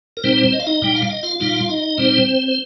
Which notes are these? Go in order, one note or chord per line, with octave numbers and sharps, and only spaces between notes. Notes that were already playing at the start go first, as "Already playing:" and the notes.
A#4
A#2 G3 C4 D#4 C5
D#5
F5
D#4 D#5
A#2 G3 D#4 G5
F5
D#5
F4 F5
A#2 G3 D#4 F4 F5
D#4 D#5
A#2 G3 C4 D#4 C5
C5